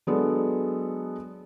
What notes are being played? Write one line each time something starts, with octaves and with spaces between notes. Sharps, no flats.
F#3 G#3 B3 D4 A4